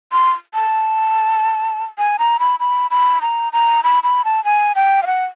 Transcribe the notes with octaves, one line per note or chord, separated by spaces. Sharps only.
C6
A5
G#5
A#5
B5
B5
B5
A#5
A#5
B5
B5
A5
G#5
G5
F5
F#5